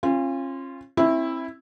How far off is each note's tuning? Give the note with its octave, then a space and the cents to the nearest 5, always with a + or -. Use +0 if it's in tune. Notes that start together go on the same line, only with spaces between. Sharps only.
C#4 -40 F4 -15
C4 +35 E4 +0